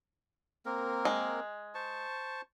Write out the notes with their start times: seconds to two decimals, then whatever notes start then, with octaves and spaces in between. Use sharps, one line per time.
0.66 A#3 C4 A#4
1.05 G#3
1.75 C5 A5 C#6